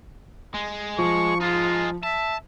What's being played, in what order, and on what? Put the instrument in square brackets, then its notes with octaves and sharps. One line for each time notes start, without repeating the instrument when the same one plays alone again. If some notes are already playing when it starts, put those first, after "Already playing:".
[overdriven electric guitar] G#3
[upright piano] F3 [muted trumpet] C#6
[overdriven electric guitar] G#3 D#4 [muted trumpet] F4
[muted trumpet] E5 [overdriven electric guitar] A5